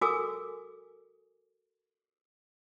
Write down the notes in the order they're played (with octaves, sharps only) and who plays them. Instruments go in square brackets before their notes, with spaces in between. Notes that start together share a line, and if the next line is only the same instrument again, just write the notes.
[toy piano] F#4 A4 A#4 G#5 D6 E6